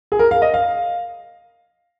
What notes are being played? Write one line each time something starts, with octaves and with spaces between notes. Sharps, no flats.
G#4
A#4
F5
D#5
F5